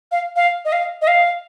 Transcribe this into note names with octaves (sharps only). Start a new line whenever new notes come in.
F5
F5
D#5
F5
D#5
F5